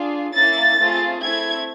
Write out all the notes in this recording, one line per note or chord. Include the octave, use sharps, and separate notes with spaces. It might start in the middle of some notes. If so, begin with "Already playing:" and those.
Already playing: D4 F4 G#4
A#3 C#4 E4 A6
A3 C4 F4 G#4
A3 C4 E4 G#6